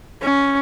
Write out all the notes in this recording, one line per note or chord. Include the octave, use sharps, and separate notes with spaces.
C#4